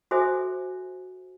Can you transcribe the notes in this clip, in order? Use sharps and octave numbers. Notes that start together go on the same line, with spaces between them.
F#4 A4 C5 E5 G#5 D#6